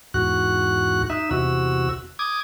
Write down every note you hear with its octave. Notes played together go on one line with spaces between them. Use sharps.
E2 G#2 F#4 F#6
D#4 E5
E2 C3 F#4 E6
D6 D#6 G#6